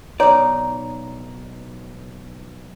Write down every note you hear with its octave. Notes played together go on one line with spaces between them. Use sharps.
B1 D#4 C#5 D5 A#5